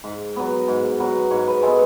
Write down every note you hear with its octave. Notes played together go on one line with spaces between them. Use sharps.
G#2
F#3 B3
G#2
F#3 B3
G#2 C#5
B4
G#3 B3 A4